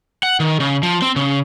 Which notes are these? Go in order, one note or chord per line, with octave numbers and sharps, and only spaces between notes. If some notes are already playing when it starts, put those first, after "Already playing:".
F#5
D#3
C#3
F3
C4
C#3